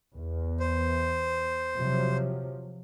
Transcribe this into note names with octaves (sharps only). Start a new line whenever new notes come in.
E2
C5
C3 F3 F#3